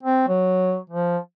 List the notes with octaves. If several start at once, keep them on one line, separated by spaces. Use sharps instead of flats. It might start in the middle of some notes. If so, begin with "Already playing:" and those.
C4
F#3
F3